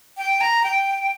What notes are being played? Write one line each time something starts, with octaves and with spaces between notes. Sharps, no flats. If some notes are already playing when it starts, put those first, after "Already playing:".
G5
A#5
G5